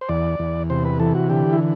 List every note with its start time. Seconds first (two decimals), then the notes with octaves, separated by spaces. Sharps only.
0.01 C5
0.09 E2 D5
0.39 E2
0.70 C3 C5
0.85 B4
1.00 E3 A4
1.15 F#4
1.29 D3 G4
1.53 E4